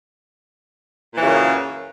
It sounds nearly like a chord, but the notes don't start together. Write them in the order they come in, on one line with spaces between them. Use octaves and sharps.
A#2 E3 C#3 F#2